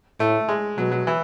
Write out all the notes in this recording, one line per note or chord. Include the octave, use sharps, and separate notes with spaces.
A2 A3
G#3
B2 F#3
F#3
E3